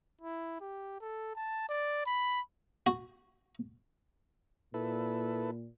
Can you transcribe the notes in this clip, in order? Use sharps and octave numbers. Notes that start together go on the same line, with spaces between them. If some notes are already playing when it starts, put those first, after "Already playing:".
E4
G4
A4
A5
D5
B5
F#4
A#2 E4 A4 B4